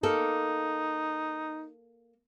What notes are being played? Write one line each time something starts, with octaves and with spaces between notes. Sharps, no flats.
A#3 D#4 A4